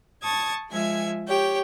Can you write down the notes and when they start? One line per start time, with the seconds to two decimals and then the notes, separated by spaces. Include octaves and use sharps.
0.22 A5 C#6 D#6 G#6 A6
0.69 F3 G#3 E5 G#5 G#6
1.26 G4 C#5 G5